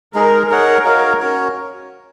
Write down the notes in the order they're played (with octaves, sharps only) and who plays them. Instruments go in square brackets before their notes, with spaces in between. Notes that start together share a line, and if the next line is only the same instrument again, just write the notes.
[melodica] G#3 D#4 G#4 [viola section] A#4
[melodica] D#4 G#4 C#5 F#5 [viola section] A#4
[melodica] D#4 F#4 C#5 F5
C#4 F#4 C#5